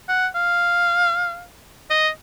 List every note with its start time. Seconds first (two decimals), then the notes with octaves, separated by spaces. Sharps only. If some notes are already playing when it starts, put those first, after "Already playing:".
0.09 F#5
0.35 F5
1.90 D#5